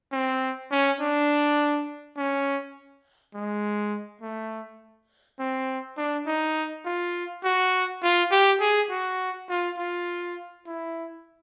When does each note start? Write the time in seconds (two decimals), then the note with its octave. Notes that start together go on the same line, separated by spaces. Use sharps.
0.12 C4
0.71 C#4
1.00 D4
2.17 C#4
3.34 G#3
4.21 A3
5.39 C4
5.97 D4
6.26 D#4
6.85 F4
7.44 F#4
8.03 F4
8.32 G4
8.61 G#4
8.90 F#4
9.49 F4
9.78 F4
10.66 E4